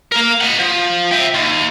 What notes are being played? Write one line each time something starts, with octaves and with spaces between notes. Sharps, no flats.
A#3 A#4
D#5 F#5
F3
E5 G5
D#2